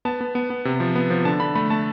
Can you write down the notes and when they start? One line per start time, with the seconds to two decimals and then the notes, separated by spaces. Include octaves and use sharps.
0.05 B3 A5
0.21 B3
0.35 B3
0.50 B3
0.65 C3
0.80 F3
0.95 B3
1.10 F3
1.25 D3 A5
1.40 D3 B5
1.55 A3 B5
1.70 A3 A5